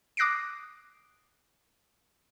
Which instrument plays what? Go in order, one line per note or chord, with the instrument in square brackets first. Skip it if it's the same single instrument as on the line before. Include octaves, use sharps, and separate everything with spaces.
[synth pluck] D6 D#6 F#6 A#6 C7 D7